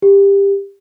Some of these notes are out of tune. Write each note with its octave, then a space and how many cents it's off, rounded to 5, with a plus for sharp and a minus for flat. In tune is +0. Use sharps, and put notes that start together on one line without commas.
G4 +20